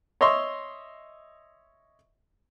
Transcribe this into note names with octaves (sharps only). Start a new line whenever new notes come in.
C#5 D#5 E5 C6 C#6